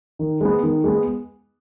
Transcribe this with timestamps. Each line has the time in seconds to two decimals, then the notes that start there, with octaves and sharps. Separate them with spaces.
0.19 D#3
0.41 G#3 B3
0.63 D#3
0.84 G#3 B3